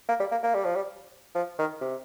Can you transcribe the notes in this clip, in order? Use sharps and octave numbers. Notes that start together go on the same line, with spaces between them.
A#3
G3
A#3
A#3
G3
F3
G3
F3
D#3
C3